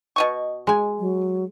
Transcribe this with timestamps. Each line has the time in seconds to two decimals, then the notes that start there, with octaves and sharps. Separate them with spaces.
0.16 B2 D#5 C#6
0.67 G#3 G#5
0.99 F#3